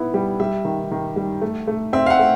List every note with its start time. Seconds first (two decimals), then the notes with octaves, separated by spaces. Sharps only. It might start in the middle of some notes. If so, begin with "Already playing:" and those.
Already playing: B3 E4
0.14 G3
0.40 G3 E5
0.65 D#3
0.91 D#3
1.16 G3
1.42 A3
1.67 A3
1.93 C4 E5
2.06 F5
2.10 F#5
2.19 A3